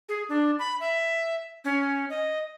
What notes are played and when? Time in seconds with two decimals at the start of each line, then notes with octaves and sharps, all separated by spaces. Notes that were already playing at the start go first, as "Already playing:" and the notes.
0.09 G#4
0.29 D4
0.59 B5
0.80 E5
1.65 C#4
2.10 D#5